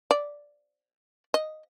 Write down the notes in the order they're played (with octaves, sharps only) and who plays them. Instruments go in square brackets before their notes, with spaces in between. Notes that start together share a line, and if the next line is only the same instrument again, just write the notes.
[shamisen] D5
D#5